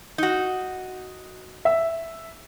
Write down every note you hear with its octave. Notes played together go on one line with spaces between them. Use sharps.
D#4 F#4
E5